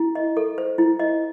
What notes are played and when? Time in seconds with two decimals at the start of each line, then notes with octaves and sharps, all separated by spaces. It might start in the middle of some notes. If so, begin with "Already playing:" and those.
Already playing: E4
0.15 D#5
0.37 A4
0.58 C5
0.78 E4
0.99 D#5